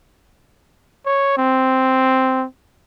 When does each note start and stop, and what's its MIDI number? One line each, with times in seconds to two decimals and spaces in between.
1.06 1.35 73
1.37 2.45 60